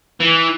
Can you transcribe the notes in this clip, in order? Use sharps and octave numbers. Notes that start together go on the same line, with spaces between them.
E3